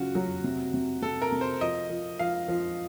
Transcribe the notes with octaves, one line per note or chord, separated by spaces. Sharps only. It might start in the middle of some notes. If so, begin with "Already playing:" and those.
Already playing: C#3 F#3 F4 F#4
F#3
C3
C3
C3 A4
A#4
C3
C5
F3 D#5
F3
F3 F5
F3